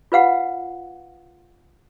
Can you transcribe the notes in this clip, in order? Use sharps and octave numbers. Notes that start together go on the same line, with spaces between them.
F4 B4 F5 F#5